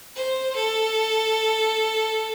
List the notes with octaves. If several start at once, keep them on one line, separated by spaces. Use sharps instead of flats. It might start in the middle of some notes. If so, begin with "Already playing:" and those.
C5
A4